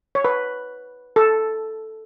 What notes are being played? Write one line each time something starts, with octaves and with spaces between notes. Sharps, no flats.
C#5
B4
A4